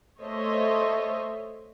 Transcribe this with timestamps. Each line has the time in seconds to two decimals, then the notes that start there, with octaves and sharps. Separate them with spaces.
0.21 A3 A4 C5 C#5 D#5 E5